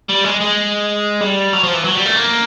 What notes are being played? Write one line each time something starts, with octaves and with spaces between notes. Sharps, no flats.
G3
G#3
G#3
G3
F#3
F3
E3
F#3
G3
A3
A#3